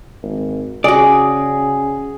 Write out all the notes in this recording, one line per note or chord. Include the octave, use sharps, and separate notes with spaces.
G#1
C#3 F#4 G#4 D5